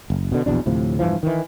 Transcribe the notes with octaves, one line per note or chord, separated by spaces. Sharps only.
F#1
B2 D3
A#1 E2 B2 D4
D2 A2 C3 F3
E1 G2 E3 F3
D#3 E3